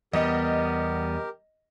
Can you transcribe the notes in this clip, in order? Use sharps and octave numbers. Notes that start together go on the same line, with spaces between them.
E2 G3 B3 G4 A#4 D#5